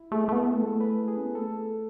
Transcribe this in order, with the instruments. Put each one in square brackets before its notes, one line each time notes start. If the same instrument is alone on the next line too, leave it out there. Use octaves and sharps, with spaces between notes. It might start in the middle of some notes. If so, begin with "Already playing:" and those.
Already playing: [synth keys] E4
[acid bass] A3 [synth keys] G#4
[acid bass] A3
B3
[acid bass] A3 [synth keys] A4
[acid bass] G#3
A3
[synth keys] B4
G#4
[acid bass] C#4
B3
[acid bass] A3 [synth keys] A4